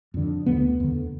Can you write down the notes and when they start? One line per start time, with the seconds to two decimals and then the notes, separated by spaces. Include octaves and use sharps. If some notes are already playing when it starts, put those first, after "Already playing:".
0.14 F2 D3
0.46 D2 D3 B3
0.80 E2 D3